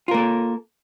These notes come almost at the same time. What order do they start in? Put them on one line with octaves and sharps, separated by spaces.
F4 A#4 A#3 A4